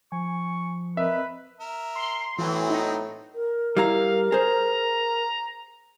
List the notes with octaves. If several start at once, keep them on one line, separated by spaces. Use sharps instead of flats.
F3 G#5 C#6
C4 A#4 B4 D#5 E5
A#4 E5
C6
A2 E3 F#3 B3 C4
D#4
A#4
G3 E4 F5 A#5
G#4 C5 A#5